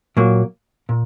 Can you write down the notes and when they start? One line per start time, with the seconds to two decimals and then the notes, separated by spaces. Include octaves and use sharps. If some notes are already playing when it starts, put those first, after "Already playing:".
0.17 A#2 F#3 A#3
0.89 A#2